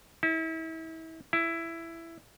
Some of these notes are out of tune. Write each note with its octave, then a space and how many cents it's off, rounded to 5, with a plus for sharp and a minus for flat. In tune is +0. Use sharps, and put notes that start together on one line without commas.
E4 -35
E4 +10